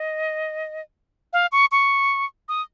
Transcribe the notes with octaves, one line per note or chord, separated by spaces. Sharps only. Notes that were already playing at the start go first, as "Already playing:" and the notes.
Already playing: D#5
F5
C#6
C#6
D#6